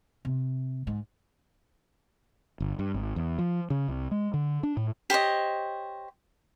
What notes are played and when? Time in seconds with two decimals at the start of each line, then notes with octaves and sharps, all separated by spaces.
0.25 C3
0.87 G#2
2.60 G1
2.79 G2
2.94 G#1
3.16 E2
3.38 F3
3.70 C#3
3.88 C2
4.11 G#3
4.34 D3
4.63 D4
4.77 A2
5.10 G4 C5 C#5 D#5